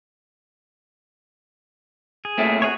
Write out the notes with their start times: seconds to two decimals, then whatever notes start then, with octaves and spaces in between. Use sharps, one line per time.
2.25 G#4
2.38 A#2 A3 C4
2.62 F#4 G#4 C#5